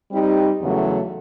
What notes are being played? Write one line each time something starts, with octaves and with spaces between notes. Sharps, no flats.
G3 C4 D#4 G4
E2 C#3 F#3 A3